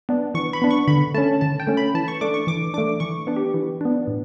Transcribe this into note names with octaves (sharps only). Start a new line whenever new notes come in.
B3 D4
E3 C#6
B5
B3 D4
C#6
D3 B5
A3 C#4 A5
D3 A5
G5
A3 C#4
B5
E3 A5
C#6
A3 D4 D6
C#6
E3 D6
A3 D4 D6
E3 C#6
B3 D4
G4
E3
B3 D4
A2